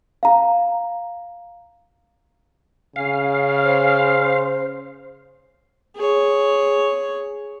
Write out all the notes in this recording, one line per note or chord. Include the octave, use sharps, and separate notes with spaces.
F5 A#5
C#3 F5 G#5
C5
G#4 C#5